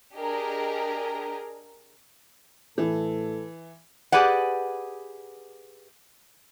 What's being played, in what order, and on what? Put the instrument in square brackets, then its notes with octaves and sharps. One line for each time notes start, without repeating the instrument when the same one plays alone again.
[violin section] D4 G4 G#4 A#4 D#5 A#5
[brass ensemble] A2 A4 [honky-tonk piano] E3
[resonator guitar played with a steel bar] G4 G#4 B4 D5 F#5